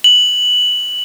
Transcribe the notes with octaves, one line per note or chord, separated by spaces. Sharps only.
F#7